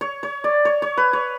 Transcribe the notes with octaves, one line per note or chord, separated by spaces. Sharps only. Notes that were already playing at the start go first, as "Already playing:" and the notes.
C#5
C#5
D5
C#5
C#5
B4
C#5